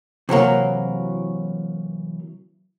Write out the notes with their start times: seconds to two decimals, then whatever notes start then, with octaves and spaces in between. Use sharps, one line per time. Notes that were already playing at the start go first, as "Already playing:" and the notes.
0.29 C3 E3 F#3 A#3